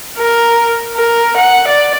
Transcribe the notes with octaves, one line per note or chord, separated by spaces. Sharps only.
A#4
A#4
F#5
D5